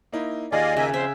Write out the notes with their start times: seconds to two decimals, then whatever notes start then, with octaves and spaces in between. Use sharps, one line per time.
0.12 A#3 D#4 E4
0.52 D#2 F4 G#4 D5 D#5 F5 G#5
0.77 C#3 A#3 E5 G#5
0.94 F2 C5 E5